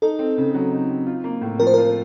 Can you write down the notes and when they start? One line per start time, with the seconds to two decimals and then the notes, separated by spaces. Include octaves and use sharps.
0.02 D#4 A4
0.19 C4
0.38 C#3
0.54 F#3
0.71 D#4
0.90 C4
1.06 F4
1.24 A#3
1.41 A2
1.60 F3 A#4
1.67 C5
1.74 F4 A#4